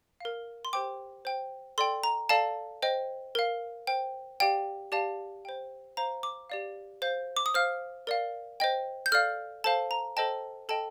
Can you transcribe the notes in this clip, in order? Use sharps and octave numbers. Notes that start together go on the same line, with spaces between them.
A#4 F5
C6
G4 C5 G5 D6
C5 G5
A4 D5 G5 C6
A#5
A4 D5 F5 A5
C5 D#5 G5
A#4 F5
C5 G5
G4 D5 F5 G5
G4 D5 F5 A5
C5 G5
C5 F5 A#5
D6
G4 D5 F5
C5 F5 G6
D6
D#6
C5 F5 F6
A#4 D5 F5
C5 D#5 G5
G6
A4 D5 F5 F6
A4 C5 F5 A5
A#5
A4 C5 D#5 G5 A5
A4 D#5 G5 A5